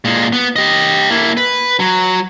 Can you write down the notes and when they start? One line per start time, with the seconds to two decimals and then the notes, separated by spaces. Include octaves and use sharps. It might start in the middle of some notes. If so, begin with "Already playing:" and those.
0.05 A#2 G#3
0.33 B3
0.56 G4 D#5
1.10 A#3 E4
1.37 B4
1.80 F#3